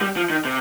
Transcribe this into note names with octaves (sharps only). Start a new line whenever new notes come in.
G3
F3
D#3
C3